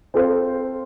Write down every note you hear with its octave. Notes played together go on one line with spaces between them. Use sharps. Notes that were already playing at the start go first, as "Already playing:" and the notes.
C4 F4 A4 C5 F5